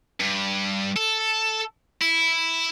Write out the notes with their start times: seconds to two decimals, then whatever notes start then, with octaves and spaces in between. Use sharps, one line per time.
0.20 G2
0.96 A4
2.01 E4